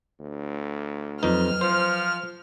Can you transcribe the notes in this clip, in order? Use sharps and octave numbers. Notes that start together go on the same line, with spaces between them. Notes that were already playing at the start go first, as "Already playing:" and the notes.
D2
F2 F#3 D#4 B4 F6
F3 C5